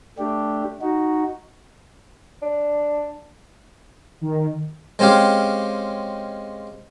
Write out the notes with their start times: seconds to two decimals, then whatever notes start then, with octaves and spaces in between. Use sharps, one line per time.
0.18 A3 D4 G4
0.81 D#4 F#4
2.42 D4
4.21 D#3
4.99 G#3 C4 C#4 G4 F5